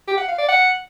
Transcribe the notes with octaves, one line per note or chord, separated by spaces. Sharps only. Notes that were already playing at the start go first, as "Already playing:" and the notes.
G4
F#5
F5
D5
F#5